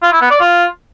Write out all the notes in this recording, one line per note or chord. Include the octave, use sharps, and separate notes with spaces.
F4
E4
B3
D5
F4